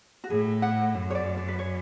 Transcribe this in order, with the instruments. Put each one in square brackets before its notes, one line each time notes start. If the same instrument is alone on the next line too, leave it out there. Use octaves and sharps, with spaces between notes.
[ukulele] F#4
[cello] A2 [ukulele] G#4
[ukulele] F#5
[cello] F#2
[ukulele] C#5
D5
D5
B4
C#5